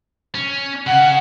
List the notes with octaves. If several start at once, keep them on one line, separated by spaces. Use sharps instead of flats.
C#4
C#3 F#5